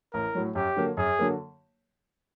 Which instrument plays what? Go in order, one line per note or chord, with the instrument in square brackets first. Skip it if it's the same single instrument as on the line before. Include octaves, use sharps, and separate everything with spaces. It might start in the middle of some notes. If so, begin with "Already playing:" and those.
[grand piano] A1 [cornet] A#4
[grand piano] A2 F#3
[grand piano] F#2 [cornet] G4
[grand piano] D3 F#3 A#3
[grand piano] F#2 [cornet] G#4
[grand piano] D3 F#3 A#3